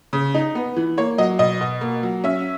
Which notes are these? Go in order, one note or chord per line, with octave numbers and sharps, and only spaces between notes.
C#3
D#4
B3
E3
A#3 C#5
F#3 D#5
B2 D#5
B2
A#3
F#3
C#4 E5